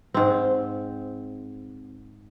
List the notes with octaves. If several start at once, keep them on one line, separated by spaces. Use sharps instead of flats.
G#2 C4